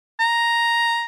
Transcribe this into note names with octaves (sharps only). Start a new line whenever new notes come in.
A#5